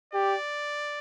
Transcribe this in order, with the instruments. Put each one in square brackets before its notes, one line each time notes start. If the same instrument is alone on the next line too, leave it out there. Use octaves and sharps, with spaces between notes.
[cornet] G4 [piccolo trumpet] D5